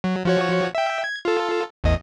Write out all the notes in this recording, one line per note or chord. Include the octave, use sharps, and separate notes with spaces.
F#3
F3 F#4 C#5
E5 G5
G#6
F4 A4
A1 E2 D#5